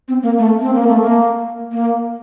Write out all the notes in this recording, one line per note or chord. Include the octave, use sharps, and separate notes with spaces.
C4
A#3
A3
C4
A#3
A3
A#3
A#3